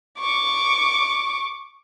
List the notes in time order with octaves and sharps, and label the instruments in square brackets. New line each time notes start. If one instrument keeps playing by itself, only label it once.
[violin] C#6 D6